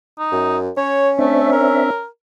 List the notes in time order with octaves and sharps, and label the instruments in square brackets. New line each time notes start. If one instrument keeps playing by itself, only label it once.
[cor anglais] D#4
[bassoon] F#2
[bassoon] C#4 [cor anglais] C#5
[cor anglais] A3 [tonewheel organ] C4 D4 E5
[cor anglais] A#4